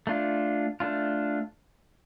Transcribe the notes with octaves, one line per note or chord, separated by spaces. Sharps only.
A3 D4 F4
A3 D4 F4